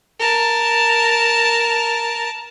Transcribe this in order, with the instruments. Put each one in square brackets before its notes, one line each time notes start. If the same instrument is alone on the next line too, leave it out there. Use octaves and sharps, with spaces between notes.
[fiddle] A#4 A5